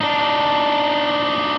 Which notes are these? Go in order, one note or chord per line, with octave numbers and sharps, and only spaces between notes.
D4 D#4